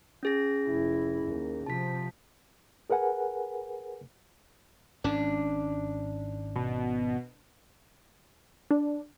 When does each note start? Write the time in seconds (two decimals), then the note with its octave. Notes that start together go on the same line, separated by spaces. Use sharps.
0.23 C#4 G#4 A#6
0.67 F1 E4
1.25 D#2
1.66 C3 F3 A5 B6
2.90 G#4 A#4 B4 F#5 G#5
5.04 G#1 G#2 C#4 D4
6.56 B2
8.71 D4